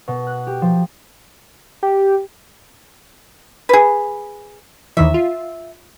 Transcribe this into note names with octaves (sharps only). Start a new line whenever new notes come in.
B2
F#6
G4
F3
G4
G#4 B4
D#2 D#3 E3 E5
F4